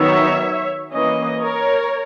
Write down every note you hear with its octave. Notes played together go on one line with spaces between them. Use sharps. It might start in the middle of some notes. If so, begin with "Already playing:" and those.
Already playing: D#3 F#3 B3 D#4 C#5 E5
E3 A#3 C#4 B4 D#5
A#4 C#5